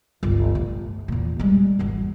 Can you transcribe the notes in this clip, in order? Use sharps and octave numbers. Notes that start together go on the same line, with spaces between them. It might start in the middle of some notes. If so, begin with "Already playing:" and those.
G1 C#2
A2
E2 A#2
G3 G#3
G#1 E2